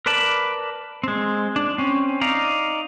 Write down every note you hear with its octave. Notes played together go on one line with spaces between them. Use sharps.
A#4 B4 D5 A5 B5
G#3 C4
D4
C4 C#4
D#4 D5 F5 A#5